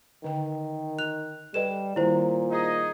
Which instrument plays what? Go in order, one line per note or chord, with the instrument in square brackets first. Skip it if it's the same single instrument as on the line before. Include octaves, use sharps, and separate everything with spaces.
[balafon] D3 G5 [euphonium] D#3
[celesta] F#6 F7
[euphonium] G3 [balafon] A4 B4 D#5 [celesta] E7
[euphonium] A#2 [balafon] D#3 G3 [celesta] E4 C5
[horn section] D#4 G#4 D#5